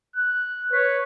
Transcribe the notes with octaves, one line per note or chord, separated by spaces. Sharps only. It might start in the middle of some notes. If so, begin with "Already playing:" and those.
F#6
B4 C#5